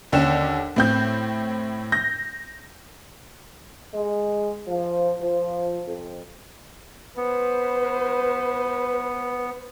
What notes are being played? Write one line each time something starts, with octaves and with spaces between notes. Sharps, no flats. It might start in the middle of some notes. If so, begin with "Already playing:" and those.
D#2 D3 C#4 G5 E7
A2 C4 G6
G6 A#6
G#3
F3
F3
F2
B3 B4 C5